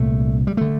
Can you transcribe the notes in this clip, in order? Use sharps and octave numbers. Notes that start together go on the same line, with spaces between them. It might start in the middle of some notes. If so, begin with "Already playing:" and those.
Already playing: C2 A#2 A3
G3
D3 A3